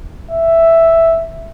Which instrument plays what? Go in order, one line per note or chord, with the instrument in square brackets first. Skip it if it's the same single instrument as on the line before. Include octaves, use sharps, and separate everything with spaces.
[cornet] E5